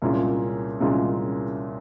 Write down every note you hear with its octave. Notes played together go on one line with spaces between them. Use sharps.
C2 A#2 G#3 C#4 F4
C2 A#2 G#3 C#4 F4